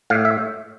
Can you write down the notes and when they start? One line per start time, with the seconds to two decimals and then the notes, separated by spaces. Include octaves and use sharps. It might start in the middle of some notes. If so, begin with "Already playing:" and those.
0.10 A2 F5
0.25 E5